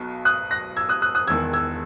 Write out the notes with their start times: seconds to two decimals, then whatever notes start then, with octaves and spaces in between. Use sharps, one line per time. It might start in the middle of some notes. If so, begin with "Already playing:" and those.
Already playing: B1 B2
0.25 D#6 F#6
0.51 F#6 A#6
0.77 E6 G#6
0.89 D#6 F#6
1.02 D#6 F#6
1.15 D#6 F#6
1.27 E1 E2 D#3 E6 G#6
1.53 E6 G#6